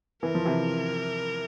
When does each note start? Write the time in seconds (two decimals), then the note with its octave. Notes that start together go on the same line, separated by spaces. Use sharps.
0.22 E3 A#4
0.35 F3
0.45 C3 E3